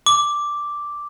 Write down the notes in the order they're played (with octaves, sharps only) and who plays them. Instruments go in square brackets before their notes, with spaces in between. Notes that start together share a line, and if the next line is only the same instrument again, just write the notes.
[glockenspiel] D6